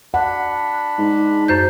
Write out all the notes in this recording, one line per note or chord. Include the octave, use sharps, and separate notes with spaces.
D4 F#5 B5
G#2
F#2 C5 G6